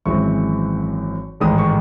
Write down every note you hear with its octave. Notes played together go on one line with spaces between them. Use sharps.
G#1 F#2 E3 G#3 C4 C#6
A1 G#2 D#3 G#3 D#6
C#6